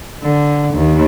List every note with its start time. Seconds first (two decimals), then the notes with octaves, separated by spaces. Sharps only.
0.24 D3
0.75 D#2